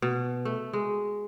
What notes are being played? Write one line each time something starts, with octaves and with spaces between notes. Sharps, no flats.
B2
A3
G#3